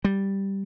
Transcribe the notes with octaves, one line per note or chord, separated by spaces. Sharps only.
G3